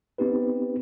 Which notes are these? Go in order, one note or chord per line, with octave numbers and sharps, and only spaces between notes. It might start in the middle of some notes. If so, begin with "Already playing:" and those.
B3 C4 D#4 G4 B4